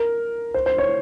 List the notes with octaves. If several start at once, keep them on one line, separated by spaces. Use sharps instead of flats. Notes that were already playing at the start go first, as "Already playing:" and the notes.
Already playing: A#4
C5
C5
C#5